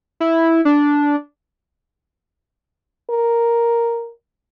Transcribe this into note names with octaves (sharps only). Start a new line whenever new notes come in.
E4
D4
A#4